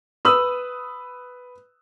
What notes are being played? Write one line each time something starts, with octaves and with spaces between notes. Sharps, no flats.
B4 D#6 E6 F#7